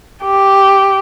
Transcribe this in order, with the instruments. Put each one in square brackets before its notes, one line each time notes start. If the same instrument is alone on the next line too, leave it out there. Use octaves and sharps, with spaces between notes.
[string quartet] G4